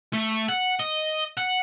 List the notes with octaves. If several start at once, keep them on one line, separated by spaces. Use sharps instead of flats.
A3
F#5
D#5
F#5